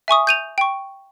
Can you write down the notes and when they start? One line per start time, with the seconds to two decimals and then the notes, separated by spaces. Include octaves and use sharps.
0.08 E5 G#5 C#6 D#6
0.27 G6 D#7 F7
0.58 G5 C#6